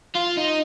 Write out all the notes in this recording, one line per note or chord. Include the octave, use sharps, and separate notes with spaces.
F4
D#4